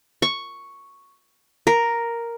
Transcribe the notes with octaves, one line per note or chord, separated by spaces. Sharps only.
C#6
A#4